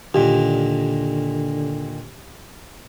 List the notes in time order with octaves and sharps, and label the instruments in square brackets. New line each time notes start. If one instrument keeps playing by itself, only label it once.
[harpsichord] D#2 A#2 [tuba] D3 [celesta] G4